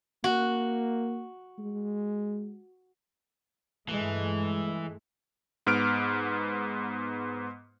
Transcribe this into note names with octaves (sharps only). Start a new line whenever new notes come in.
A#3 F#4
G#3
G2 E3 G#3 A3
G#2 B3 F6 D7